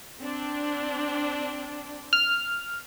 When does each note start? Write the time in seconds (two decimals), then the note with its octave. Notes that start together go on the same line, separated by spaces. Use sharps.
0.21 C4 D4
2.13 F6